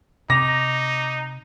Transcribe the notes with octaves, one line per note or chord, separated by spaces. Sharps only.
C3 D#4 D6 A#6 F7